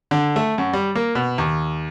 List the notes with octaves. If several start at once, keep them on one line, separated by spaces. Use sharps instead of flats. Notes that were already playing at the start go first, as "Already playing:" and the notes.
D3
A3
F#2
G3
A#3
B2
D#2